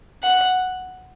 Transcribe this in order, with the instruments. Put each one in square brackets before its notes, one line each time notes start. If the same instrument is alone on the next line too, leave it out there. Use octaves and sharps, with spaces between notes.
[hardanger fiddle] F#5